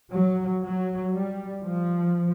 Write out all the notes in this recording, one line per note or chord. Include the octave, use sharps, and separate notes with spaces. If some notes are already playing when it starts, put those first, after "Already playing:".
F#3
F#3
G3
F3